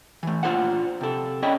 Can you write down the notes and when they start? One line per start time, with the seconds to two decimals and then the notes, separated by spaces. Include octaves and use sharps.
0.23 E3 A3
0.43 A#2 D4 F4 G#4 C5 F#5
1.01 C3 A4
1.42 C#4 G#4 D5 D#5 G5 B5